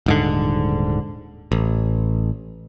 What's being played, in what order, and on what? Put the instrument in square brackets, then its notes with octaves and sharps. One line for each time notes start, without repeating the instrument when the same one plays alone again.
[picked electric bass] D#1 G#2 D3
A1